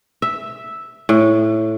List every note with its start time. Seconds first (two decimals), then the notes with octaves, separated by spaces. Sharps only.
0.22 E5
1.09 A2